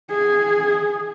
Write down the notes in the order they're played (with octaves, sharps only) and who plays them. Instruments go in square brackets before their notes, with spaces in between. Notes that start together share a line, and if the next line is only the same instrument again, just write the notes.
[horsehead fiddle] G#4